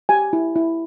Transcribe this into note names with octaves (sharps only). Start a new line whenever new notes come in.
G4 G#5
E4
E4